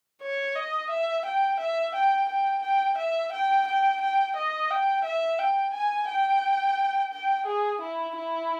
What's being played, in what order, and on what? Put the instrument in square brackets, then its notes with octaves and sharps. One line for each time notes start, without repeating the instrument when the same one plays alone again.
[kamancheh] C#5
D#5
E5
G5
E5
G5
G5
G5
E5
G5
G5
G5
D#5
G5
E5
G5
G#5
G5
G5
G#4
E4
E4